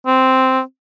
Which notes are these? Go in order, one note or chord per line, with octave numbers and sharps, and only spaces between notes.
C4